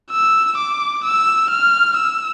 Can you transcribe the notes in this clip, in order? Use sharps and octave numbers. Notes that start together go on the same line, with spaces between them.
E6
D6
E6
F6
E6